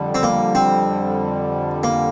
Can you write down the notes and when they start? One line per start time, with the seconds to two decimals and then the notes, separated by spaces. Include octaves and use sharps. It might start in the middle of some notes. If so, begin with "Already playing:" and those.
Already playing: F2 D3 G3
0.15 C4
0.23 A#3
0.55 C4
1.83 A#3